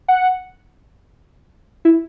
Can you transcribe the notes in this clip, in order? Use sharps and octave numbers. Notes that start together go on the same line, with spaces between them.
F#5
E4